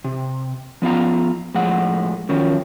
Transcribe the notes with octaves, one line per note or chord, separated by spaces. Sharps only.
C3
F3 B3 F4 F5 A#5
A2 F3 G#3 F#5
D#3 F3 F#3 C#4